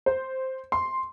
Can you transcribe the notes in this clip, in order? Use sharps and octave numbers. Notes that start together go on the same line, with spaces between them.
C5
C6